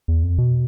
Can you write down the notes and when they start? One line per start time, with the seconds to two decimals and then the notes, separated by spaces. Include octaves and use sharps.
0.08 E2
0.23 F2
0.38 B2